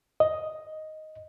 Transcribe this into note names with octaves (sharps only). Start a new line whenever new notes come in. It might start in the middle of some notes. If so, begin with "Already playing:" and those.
D#5